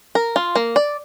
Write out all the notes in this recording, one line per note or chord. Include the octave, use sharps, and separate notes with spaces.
A#4
F4
A#3
D5